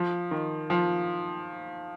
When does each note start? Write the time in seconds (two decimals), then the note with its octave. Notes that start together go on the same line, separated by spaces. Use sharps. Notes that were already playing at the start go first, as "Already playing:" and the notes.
Already playing: F3
0.31 D#3
0.70 F3